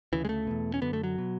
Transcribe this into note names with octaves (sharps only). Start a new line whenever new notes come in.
D2 C#3 E3
G#3
A3
E2 B2
C#4
F#2 D3 B3
A3
F#3
B2